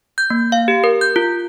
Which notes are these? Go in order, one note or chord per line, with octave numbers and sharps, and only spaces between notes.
G6
A#3
F5
G4
A#4
G6
F4